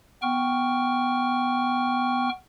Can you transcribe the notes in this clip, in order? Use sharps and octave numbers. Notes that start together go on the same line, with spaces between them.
B3 G5 C#6 F6